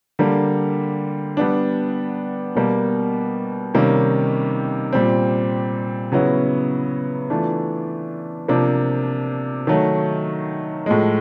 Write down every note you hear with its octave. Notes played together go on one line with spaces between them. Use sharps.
D3 G3 A#3
G3 B3 D4
B2 G3 A#3
C3 D#3 G3 A#3 C#4
A#2 G3 C4
C#3 F#3 B3 E4
E3 A3 D4 F4
C3 F3 A#3 D4
D#3 F#3 A3
A2 F3 G#3